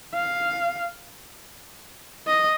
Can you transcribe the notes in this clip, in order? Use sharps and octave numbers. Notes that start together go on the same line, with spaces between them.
F5
D#5